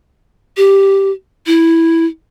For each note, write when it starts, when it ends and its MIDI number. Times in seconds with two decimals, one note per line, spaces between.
0.57 1.11 67
1.46 2.05 64